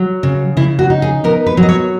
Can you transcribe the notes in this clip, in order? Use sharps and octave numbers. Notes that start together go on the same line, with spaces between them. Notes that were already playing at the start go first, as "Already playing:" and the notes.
Already playing: F#3
C#3
C#3 E4
F#4
D#4
G#4
B3 A#4
B4
F#3
D#5
C#5